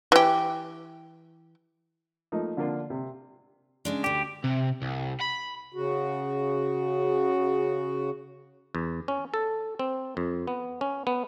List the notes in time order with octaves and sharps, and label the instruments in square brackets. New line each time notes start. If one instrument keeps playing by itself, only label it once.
[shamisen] E3 G4
[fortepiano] F3 A3 A#3 D#4
D3 F3 A#3 D4 F4
C3
[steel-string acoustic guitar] C#3 G#3 D4
[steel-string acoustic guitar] D2 D3 [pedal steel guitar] G4
[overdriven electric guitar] C3
C2
B5
[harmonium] C#3 F#4
[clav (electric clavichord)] E2
C#4
A4
C4
F2
B3
C#4
B3